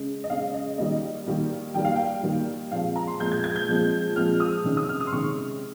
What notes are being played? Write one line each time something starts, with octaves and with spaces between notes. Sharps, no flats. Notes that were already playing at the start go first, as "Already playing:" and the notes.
Already playing: C#3 G#3 C#4
D#5
C#3 G#3 C#4 F5
D#5
D#3 G3 A#3 D#5
D#3 G3 A#3
D#3 G3 A#3 G5
F5
G5
D#3 G3 A#3
A#2 F3 G#3 C4 F5
A#5
C6
A#2 F3 G#3 C4 G6
G#6
G#6
G6
A#2 F3 G#3 C4
A#2 F3 G#3 C4 F6
D#6
C3 D#3 G#3 C#4
D#6
F6
D#6
C6
C3 D#3 G#3 C#4 C#6